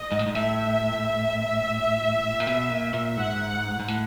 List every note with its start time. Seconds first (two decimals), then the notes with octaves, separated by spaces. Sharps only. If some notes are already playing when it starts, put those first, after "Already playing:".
Already playing: D#5
0.12 G#2
0.19 A2
0.26 G#2
0.35 A2 E5
2.40 A#2
2.47 B2
2.70 A#2
2.93 A#2
3.17 G#2 F#5
3.80 G#2
3.88 A2